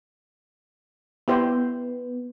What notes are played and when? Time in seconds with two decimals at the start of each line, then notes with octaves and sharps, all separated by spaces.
1.28 B3 E4 G4 C5